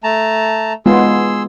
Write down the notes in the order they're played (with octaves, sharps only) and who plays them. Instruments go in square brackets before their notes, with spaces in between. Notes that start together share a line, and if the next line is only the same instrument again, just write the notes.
[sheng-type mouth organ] A3 A5 A#5
[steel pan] G#3 B3 F4 [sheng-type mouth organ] G#4 C6 E6